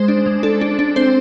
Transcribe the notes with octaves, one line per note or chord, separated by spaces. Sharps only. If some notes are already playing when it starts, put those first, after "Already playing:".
Already playing: G#3 C5
D4
G#3
D4 A4
D4
D4
C4 C5